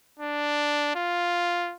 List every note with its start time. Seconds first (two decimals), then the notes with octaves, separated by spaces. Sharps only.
0.20 D4
0.96 F4